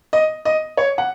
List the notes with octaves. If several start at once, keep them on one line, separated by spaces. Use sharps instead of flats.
D#5
D#5
C#5
F#5